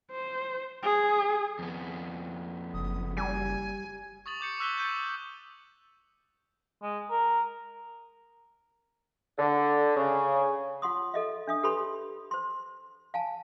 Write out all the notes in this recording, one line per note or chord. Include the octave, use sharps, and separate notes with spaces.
C5
G#4
F2 B3
F#1 D#6
G3 G#5
C#6 D#6 A6 F#7
D6 G6 C#7
C#6 E6 F#6 B6 C#7 G7
G6 A6 D#7
G#3
A#4
D3
C#3
F4 F#5 C6 D#6
A4 D#5 E5
D4 E5 D#6
G4 A4 B4 C#5 B5 C6
C5 C6
F5 G#5 A5